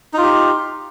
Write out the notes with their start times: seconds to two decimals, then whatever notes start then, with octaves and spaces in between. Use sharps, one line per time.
0.13 D#4
0.18 F4
0.23 G4